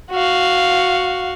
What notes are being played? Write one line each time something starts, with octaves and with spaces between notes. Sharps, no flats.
F#4 F5